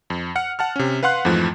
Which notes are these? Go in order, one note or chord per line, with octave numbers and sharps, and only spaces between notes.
F2
F#5 F6 C#7
F#5 A5 F6
C3 C#4
B4 F5 F#5 C6 F#6
F2 G#2 E3 F3 A3